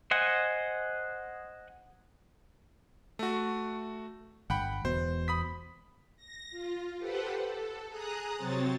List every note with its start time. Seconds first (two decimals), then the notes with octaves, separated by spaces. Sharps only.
0.11 C5 D#5 F#5 G#5
3.19 A3 F#4
4.50 G1 F#5 G5 B5
4.85 E1 B2 C5
5.28 B5 D#6 B6
6.16 A#6
6.51 F4
6.97 G4 A4 B4 C5 F#5
7.44 A4
7.88 G#4 A#5 D#6 F#6
8.35 C3 F#3 C4 C5 C#5 A6